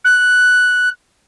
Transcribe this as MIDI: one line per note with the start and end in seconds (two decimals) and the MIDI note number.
0.04 0.89 90